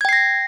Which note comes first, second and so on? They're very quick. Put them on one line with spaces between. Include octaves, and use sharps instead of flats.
G#6 G5 C7 A#6